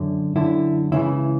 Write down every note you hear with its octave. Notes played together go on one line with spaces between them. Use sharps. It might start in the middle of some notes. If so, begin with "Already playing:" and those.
Already playing: F#2 D3
F#2 D3 E4
C#2 C#3 E3 E4